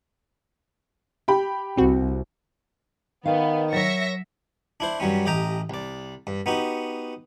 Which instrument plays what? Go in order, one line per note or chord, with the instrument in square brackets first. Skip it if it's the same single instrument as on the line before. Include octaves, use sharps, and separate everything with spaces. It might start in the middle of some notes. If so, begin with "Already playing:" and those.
[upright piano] G4 G5 B5
[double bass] C2 [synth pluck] C4 F#4
[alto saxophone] D#3 [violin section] B3 [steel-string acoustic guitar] F5
[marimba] F#3 [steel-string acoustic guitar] A#4 C#5 [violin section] E5 A#6 C#7
[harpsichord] D4 E4 C5
G2 F#3 G3 C#4
A1 G4 D#5 G5 A#5
C2 D5
G2
B3 D#4 F#4 G4